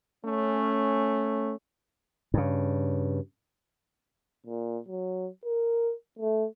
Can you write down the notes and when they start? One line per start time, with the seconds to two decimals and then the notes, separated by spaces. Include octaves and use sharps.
0.25 A3 C#4
2.34 G2 C#3
4.46 A#2
4.88 F#3
5.45 A#4
6.19 A3